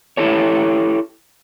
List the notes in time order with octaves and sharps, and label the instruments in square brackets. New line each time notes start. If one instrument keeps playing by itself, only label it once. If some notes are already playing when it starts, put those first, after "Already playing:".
[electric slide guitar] E4 G4 A4 C#5